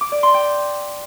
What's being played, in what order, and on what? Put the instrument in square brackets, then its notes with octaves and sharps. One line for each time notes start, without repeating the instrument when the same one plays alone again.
[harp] D6
D5
C6
G5